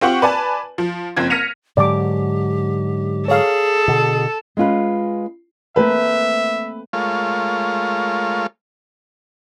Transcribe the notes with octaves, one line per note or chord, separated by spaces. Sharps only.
C4 F4 G4 F#5 C#6 F#7
B4 D5 G#5 A5
F3
F#1 F3 C4 G#6
F6 A#6 B6 C#7 D#7 F7
G#2 D3 F#3 G4 D5 D6
G#4 A4 C#5 F5
B2 D3
G#3 C#4 F4 B4
A3 A#3 C4 B4 E5
G#3 A3 F4 A#4 C#5 F5